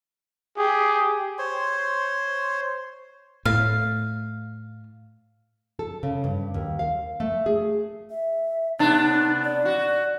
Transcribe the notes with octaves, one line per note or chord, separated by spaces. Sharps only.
G4 G#4
C5 C#5 C6
A2 F5
A4
C#3
G2
D#2
F5
A3
G#4
E5
C3 B3 D4 D#4
D5
F#4